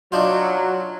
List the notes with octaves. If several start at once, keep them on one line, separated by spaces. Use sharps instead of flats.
F#3 D4 D#4 F4